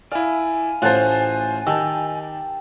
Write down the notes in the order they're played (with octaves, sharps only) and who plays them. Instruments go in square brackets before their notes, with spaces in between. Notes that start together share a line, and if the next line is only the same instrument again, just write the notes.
[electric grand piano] E4 D5 [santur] F5 [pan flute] G#5
[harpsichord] A1 A2 [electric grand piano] F4 C5 [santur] F#5 A5
[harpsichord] D#3 [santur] G4 [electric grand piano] A5 E6